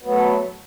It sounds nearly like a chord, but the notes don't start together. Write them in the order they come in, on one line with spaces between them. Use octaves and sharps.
B3 F#3 A3